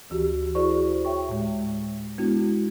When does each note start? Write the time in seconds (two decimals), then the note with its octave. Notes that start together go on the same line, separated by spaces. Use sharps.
0.10 D2 E3 F#4 G4
0.55 E4 F#4 G#4 C5 D5 C#6
1.05 C#5 E5 G5 C#6
1.29 A2 G#3
2.18 G#3 B3 D4 E4 F#4